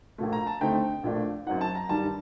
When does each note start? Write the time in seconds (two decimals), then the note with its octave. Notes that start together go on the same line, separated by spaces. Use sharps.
0.18 A#1 A#2 A3
0.33 A#5
0.47 A5
0.61 D2 D3 A3 C4 D#4 G5
1.03 A#1 A#2 A3 D4
1.46 F#2 F#3 C4 D#4 F#5
1.61 A5
1.75 A#5
1.89 G2 D#3 G3 A5